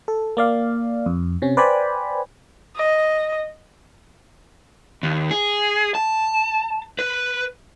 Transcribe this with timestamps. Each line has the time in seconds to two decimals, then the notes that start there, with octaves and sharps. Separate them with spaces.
0.08 A4
0.37 A#3 D5 F5
1.06 F2
1.42 C3 C#4
1.57 B4 C5 D5 G5 G#5 B5
2.76 D#5
5.03 D#2
5.31 G#4
5.95 A5
6.99 B4